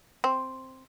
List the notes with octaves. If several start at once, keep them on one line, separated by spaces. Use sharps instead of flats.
C4